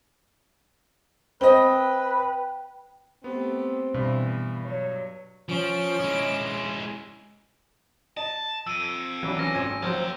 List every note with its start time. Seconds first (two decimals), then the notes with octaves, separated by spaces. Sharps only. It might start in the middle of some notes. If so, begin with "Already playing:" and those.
1.41 C4 B4 D#5 G5
3.24 A3 B3 C4 G4
3.94 G2 B2 E3 B3
4.65 F#3 C#5
5.49 F3 C#4 D7
6.00 G#3 E4
8.17 D#5 A5
8.67 F2 E6 D7 D#7
9.23 E3 F#3 D4
9.39 C#4 A#6
9.55 G#1 G#5
9.83 F3 F#3 A#3 G5